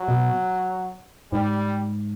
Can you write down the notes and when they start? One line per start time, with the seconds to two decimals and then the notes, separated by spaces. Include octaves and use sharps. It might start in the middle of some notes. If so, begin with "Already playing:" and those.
Already playing: F#3
0.08 B2
1.32 G#2 G3